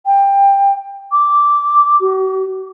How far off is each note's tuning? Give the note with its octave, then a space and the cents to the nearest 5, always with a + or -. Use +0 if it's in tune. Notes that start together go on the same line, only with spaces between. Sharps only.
G5 +20
D6 -5
F#4 +45